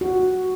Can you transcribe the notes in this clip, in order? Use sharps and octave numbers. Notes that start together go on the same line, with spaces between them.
F#4